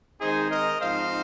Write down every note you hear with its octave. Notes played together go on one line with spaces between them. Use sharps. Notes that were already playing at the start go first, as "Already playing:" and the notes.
D#3 G#3 C4 D#4 G#4 C5
A#4 D#5
G#2 F3 C4 D#4 C5 F5